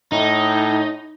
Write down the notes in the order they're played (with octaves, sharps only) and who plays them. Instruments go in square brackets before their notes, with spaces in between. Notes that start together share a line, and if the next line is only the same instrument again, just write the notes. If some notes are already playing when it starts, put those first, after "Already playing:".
[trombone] A2 [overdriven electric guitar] D#4